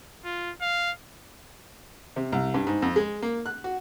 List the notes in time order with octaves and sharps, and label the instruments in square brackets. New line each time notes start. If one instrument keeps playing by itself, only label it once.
[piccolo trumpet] F4
F5
[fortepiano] C3
C2
G2
G#2
F2
G#3
A#3
F#6
F#4